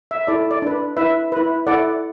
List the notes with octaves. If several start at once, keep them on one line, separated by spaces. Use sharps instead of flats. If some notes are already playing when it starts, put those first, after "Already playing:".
E5
E4 A4 D5
D5
D4 B4
E4 B4 E5
E4 B4
E4 A4 D5 F#5